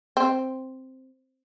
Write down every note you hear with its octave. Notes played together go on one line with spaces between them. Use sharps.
C4